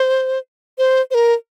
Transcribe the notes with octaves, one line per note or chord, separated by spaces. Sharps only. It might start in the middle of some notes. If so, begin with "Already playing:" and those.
Already playing: C5
C5
C5
A#4